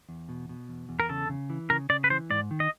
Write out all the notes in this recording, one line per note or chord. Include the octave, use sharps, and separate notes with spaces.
E2
B2
B2
E2
E2
A#4
C#3 A4
C#3
E3
C#3 A#4
C#3 D5
B4
E3 C5
G#2 D5
D#3
D#5